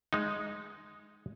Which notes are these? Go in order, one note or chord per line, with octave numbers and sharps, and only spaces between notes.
G#3 D#4